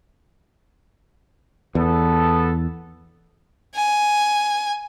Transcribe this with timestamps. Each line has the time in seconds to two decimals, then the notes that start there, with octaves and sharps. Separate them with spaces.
1.75 E2 B3 A4
3.75 G#5